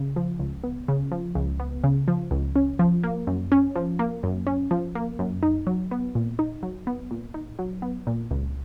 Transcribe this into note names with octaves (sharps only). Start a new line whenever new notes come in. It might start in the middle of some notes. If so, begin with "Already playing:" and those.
Already playing: C#3
F3
C#2
B3
C#3
F3
C#2
B3
C#3
F3
C#2
C#4
F3
A#3
F#2
C#4
F3
A#3
F#2
C#4
F3
A#3
F#2
D#4
F#3
B3
A#2
D#4
F#3
B3
A#2
D#4
F#3
B3
A#2
C#2